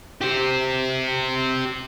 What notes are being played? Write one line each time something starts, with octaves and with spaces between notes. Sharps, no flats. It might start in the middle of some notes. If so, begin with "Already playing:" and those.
G4 C5